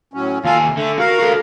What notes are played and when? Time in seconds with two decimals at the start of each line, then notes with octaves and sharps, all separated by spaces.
0.14 A2 F#3 C#4
0.44 D#2 F4 A4 F5 G#5
0.63 C3
0.77 D3 A3 E5
0.99 F#4 A#4 F5
1.20 F#4 A4